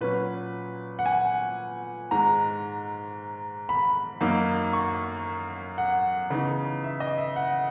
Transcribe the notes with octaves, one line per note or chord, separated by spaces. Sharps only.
A#2 F#3 C#4 B4
F#5
G#5
G#2 D#3 G#3 A#5
B5
F#2 D#3 A#3 D#4
C#6
F#5
C#3 E3 B3 D#4
E5
D#5
E5
F#5